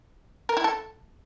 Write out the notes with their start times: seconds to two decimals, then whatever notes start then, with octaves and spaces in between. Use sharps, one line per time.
0.49 A#4
0.57 E4
0.64 A4